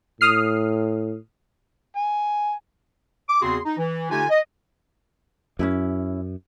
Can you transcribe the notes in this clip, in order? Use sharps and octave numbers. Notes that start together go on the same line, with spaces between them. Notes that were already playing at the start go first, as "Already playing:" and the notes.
A2 D#6 F6 C7
G#5
D6
E2 C#3 C4 F#4 G#4 C6
D#4
E3
D3 A3 D#4 F4 G4 G#5
D#5
F#2 C#4 D#4 E4